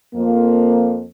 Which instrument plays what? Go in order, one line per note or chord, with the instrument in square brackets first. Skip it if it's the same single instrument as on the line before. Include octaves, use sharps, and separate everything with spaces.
[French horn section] F2 A#3